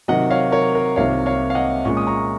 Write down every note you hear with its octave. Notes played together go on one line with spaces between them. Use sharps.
C3 D#3 F#3 D#5 F#5
C#5 F5
A#4 C#5
A#4
C2 C3 D#3 A#3 F4 C#5 F5
C#5 F5
F5
D#5 F#5
A#2 G#3 C#4 F4 C#6
D#6
A#5 C#6